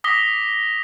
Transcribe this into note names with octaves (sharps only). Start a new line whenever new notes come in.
D6 D#6 A#6 B6 G7